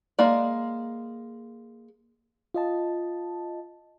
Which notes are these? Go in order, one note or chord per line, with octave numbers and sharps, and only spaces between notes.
G#3 A#3 D5
F4 D#5 A5